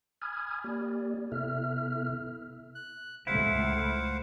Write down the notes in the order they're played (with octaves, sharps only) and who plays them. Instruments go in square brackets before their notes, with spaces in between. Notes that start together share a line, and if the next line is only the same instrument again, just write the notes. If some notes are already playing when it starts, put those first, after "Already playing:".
[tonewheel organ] G#5 B5 D#6 F6 G#6
A#3 G4 D5
C3 B3 E4 A4 E5 F6
[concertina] F#6
[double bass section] C#2 A3 [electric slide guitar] E4 [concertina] C5 F5 F#5